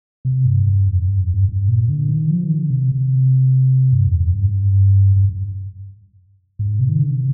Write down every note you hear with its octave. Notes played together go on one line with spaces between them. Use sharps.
C3
G2
G2
F2
G2
F2
G2
G2
A#2
D3
D#3
F3
D#3
D3
C3
C3
G2
F2
F2
G2
G#2
G2
G2
G2
G#2
C3
D#3
D3
C3